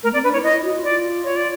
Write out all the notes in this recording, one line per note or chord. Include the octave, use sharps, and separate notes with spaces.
A3 A#4
C4 D5
D4 B4
E4 C#5
E4 D#5
E4
F#4
F4
D5
C#5
D5